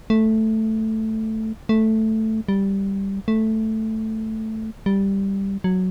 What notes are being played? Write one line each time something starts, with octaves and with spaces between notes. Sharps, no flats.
A3
A3
G3
A3
G3
F#3